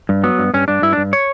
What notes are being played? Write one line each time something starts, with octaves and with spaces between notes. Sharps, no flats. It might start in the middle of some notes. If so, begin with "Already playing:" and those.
G2
F#3 B3
G2
G2 C#4
G2 D4
G2 E4
D4
G2
C#5